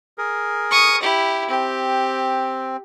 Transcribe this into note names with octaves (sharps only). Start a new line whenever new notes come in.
G#4 A#4
C#6 D#6
E4 G4
C4 G4